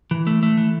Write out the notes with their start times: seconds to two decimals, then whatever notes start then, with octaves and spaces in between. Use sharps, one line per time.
0.11 E3
0.27 A3
0.43 A3
0.57 E3